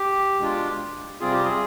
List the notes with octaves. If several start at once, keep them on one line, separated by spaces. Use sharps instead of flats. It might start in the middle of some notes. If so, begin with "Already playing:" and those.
Already playing: G4
B2 G#3 D4 F4
C3 G3 C4 F4 G#4
G4
G#4